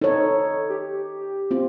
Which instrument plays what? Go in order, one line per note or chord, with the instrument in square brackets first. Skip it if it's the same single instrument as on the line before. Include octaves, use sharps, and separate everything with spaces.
[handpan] D#4 C#5 [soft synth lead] A4
[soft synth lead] G4
[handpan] C4 F4